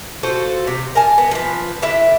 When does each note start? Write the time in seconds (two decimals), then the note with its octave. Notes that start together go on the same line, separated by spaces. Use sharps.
0.23 F4 F#4 A4 C5
0.67 C3
0.95 A#4 G#5 A5
1.18 B3
1.31 F3 B4
1.82 D3 E4 E5